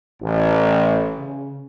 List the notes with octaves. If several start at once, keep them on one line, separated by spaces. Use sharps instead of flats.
A1
C#3